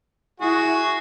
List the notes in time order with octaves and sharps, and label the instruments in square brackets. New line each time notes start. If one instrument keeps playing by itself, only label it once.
[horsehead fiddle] E4 [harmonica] F#4 G#4